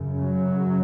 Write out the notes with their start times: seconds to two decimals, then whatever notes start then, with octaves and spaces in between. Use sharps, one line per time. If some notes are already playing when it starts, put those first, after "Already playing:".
Already playing: F#2 C#3
0.20 F#3